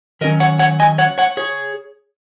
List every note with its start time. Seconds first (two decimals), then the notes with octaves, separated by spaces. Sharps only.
0.21 D#3 F#3 C#4 A#4 D#5
0.40 C#5 F#5
0.59 C#5 F#5
0.80 D#5 G#5
0.98 C#5 F#5
1.18 C#5 F#5
1.37 G#4 C#5